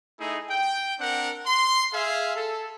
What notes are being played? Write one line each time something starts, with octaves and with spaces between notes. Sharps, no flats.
A3 D#4 E4 G#4
G5
C4 D4 A#4 F#5
C6
G#4 E5 F5
A4